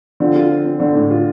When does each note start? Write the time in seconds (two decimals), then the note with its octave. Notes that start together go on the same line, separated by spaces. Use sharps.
0.20 D3 F3 C4
0.35 F4
0.50 C4
0.65 C4
0.79 D3 C4
0.94 A2
1.10 F4